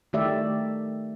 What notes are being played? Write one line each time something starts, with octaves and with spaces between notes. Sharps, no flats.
D#3 A3 G4 D5 E5